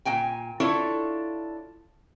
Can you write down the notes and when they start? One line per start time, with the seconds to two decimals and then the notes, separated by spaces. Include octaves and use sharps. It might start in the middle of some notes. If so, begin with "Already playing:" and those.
0.05 A#2 G5 G#5
0.60 D4 E4 F4 A4 C#5